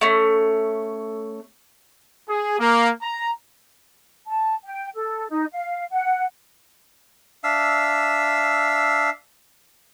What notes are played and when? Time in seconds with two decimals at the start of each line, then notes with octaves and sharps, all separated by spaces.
0.01 A3 C#4
2.29 G#4
2.59 A#3
3.02 A#5
4.28 A5
4.64 G5
4.95 A4
5.30 D#4
5.53 F5
5.91 F#5
7.44 D4 E5 F5 E6